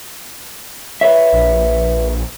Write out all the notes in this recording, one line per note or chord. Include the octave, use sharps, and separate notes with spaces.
B4 C#5 E5
A#1